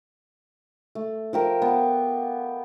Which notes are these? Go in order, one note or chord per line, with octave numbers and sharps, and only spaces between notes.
A3
F3 G4 A#4
B3